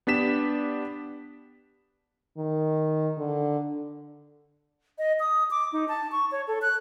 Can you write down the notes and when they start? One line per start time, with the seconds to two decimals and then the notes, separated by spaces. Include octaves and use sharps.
0.07 B3 D4 G4 B6 E7
2.37 D#3
3.18 D3
4.98 D#5
5.20 D#6
5.51 D6
5.73 D#4
5.88 A5
6.12 C#6
6.32 C#5
6.48 A4
6.62 F#6